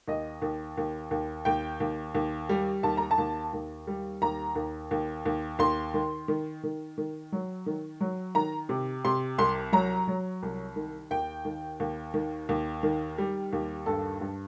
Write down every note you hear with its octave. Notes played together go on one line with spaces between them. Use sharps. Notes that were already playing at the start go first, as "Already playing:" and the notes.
D#2 D#5
D#2
D#2
D#2
D#2 G5
D#2
D#2
G3
D#2 A5
A#5
A5
D#2
D#2
G3
D#2 A#5
D#2
D#2
D#2
D#2 C6
D#3
D#3
D#3
D#3
F#3
D#3
F#3
D#3 A#5
C3
C3 C6
C2 C6
F#3 A#5
F#3
C2
D#3
D#2 G5
D#3
D#2
D#3
D#2
D#3
G3
D#2
G2 A4
G2